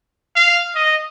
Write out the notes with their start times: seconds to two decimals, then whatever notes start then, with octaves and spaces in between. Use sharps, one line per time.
0.36 F5
0.75 D#5